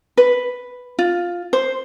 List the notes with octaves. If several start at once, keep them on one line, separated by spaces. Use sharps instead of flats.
B4
F4
C5